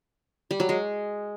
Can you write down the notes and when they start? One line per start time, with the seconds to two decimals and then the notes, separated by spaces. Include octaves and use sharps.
0.51 G3
0.60 F#3
0.69 G#3